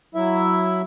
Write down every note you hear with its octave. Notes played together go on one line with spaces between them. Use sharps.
F#3 E4 E5